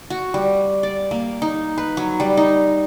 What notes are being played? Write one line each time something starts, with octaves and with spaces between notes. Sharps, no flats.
F#4
G3
D5
A#3
D#4
B4
F#3
G3
D#4